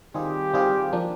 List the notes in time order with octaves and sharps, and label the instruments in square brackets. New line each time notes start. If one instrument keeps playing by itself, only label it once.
[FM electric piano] D#3 G3 C4 F4 G#4 [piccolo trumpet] G4
[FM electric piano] D#3 G3 C4 F4 G#4
F3 A#3 D4